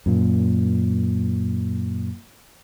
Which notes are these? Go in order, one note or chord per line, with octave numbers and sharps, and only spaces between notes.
F#2 A#2